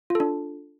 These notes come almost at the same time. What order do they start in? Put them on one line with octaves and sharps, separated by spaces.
F4 A4 D4